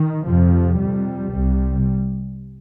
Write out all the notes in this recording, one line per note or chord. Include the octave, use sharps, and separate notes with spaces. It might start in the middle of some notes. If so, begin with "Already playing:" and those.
Already playing: D#3
F2 C3 F3
F2 C3 G3
C2 C3